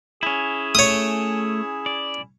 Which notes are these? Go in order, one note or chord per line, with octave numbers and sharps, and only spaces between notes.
C#4 E4 G#4
A3 C#5 D#6
D5